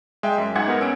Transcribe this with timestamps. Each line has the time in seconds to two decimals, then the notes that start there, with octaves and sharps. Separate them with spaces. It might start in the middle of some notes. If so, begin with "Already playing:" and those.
0.23 G#3 E5 G5
0.38 F#2
0.55 G#2 F#5 G#6 C#7
0.67 B3 A#4
0.81 C#4 E6 D7